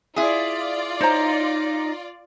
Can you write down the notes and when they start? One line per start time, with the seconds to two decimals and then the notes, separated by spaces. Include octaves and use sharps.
0.16 E4 F4 G#4 D5
1.01 D#4 C5 C#5 A#5